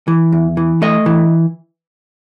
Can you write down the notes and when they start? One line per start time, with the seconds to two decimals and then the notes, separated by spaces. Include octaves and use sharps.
0.08 E3
0.32 E2
0.57 E3
0.82 A3 D#5
1.06 E3